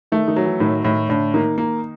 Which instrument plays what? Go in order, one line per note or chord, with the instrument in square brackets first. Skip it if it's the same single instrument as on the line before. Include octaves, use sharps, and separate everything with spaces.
[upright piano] D#3 D#4 [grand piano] A3
[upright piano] D#3 D#4
[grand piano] F#3
[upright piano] E3 E4
[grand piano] A2 [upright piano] D#3 D#4
[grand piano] A2 [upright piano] D#3 D#4
[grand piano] A2 [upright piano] D3 D4
[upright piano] D#3 D#4 [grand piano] A#3
[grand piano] A#3